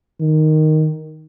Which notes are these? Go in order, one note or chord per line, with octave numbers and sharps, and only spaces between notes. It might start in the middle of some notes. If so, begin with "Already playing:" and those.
D#3